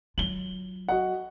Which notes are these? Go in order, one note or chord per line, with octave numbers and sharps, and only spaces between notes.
F#3 F4 F#7 G7
F#4 D#5 F#5